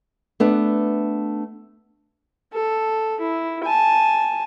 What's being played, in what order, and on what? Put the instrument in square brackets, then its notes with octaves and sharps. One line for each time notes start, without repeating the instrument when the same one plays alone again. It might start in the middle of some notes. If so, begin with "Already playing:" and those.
[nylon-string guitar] A3 B3 D4
[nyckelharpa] A4
E4
G#5 A5